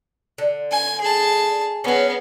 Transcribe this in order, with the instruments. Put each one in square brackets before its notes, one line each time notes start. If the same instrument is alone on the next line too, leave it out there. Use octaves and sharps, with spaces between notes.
[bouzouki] D3
[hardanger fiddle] G#5
G#4 A5
[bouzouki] F#3 C#4 [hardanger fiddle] B3 G#4